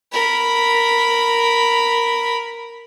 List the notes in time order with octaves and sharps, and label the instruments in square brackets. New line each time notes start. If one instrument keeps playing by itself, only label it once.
[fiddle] A#4 B5